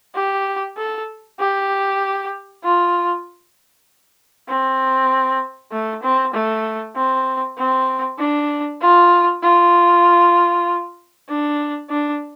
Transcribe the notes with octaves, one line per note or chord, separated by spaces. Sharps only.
G4
A4
G4
F4
C4
A3
C4
A3
C4
C4
D4
F4
F4
D4
D4